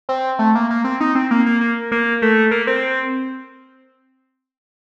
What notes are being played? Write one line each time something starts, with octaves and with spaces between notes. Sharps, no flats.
C4
A3
A#3
A#3
C4
D#4
C4
A#3
A#3
A#3
A#3
A3
A#3
C4